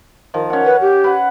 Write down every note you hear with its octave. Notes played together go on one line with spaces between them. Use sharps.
D#3 F3
C#4 F#5
B4
G4
B4 F#5